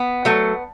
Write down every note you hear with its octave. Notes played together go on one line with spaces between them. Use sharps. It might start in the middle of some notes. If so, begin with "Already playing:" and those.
Already playing: B3
F#3 A3